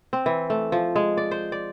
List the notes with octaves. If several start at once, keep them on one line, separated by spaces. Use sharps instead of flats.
C4
E3
A3
F3
G#3
D5
C5
D5